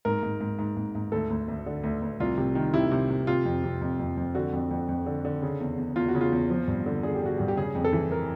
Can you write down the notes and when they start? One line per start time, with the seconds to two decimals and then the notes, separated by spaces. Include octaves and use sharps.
0.05 G#2 A#4
0.23 G#2
0.40 G#2
0.59 G#2
0.77 G#2
0.95 G#2
1.12 D2 A4
1.30 D2
1.48 D2
1.66 D3
1.83 D2
2.02 D2
2.20 C2 F4
2.38 C3
2.55 D#3
2.74 C3 E4
2.91 C3
3.10 C3
3.27 C3 F4
3.45 F2
3.63 C3
3.81 F2
4.00 F2
4.17 F2
4.35 D3 F#4
4.53 F2
4.71 F2
4.89 F2
5.06 D3
5.25 D3
5.42 C#3
5.60 E2
5.78 E2
5.96 E2 F4
6.08 F#4
6.15 C#3
6.21 F4
6.32 E2
6.50 F3
6.68 G2
6.86 D3
7.03 D3 G#4
7.15 G4
7.22 D3 F#4
7.37 G2 G4
7.48 G4
7.57 C#3 G#4
7.75 F2
7.84 A4
7.93 E3
8.12 A#4